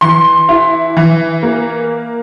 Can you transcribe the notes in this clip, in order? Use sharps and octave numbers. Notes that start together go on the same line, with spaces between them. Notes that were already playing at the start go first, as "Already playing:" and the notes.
E3 C6
E4
E3
A#3